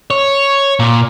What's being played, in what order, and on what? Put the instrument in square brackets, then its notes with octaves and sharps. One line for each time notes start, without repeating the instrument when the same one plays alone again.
[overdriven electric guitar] C#5
A#2